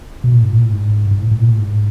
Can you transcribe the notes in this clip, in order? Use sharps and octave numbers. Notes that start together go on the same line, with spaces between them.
B2
A#2
G#2
A#2
A2
G#2
G#2
A2
A2
A#2
A2
G#2